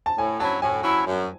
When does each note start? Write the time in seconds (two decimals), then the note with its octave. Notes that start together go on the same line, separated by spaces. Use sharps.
0.06 A5
0.18 A2 G#5
0.39 F#3 C#4 E4 A5
0.62 A2 G#5
0.83 F#3 C#4 E4
1.06 F#2